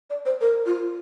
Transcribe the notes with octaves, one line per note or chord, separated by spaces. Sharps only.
D5
C5
A#4
F4